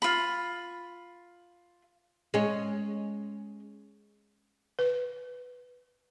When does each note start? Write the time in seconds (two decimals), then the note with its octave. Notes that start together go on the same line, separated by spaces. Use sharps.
0.02 F4 B5
2.34 G#3 C#4
4.79 B4